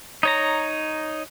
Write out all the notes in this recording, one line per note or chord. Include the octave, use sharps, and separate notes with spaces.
D#4 C#5 A#5